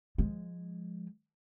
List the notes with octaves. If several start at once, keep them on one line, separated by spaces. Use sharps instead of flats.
F3 G#3